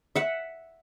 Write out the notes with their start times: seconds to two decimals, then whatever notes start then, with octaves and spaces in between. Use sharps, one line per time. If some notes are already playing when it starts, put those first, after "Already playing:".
0.16 E5 F#5